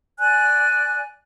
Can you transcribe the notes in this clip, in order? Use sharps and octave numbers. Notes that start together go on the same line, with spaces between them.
D5 G#5 F#6